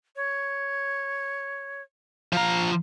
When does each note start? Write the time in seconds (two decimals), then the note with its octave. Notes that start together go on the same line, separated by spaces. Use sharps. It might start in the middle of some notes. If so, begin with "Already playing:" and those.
0.16 C#5
2.33 F3 F5 A#5